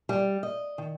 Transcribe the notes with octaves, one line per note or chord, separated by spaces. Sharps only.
G3
D#5
D#3